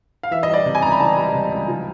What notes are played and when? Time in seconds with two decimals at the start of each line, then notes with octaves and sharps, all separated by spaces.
0.23 F5
0.31 E3 E5
0.43 D#5
0.48 G3
0.54 D5
0.65 C3
0.75 G#5
0.82 C#2 A#5
0.91 B5
1.00 E3 A5
1.18 G3
1.34 C3
1.52 C#2
1.68 F3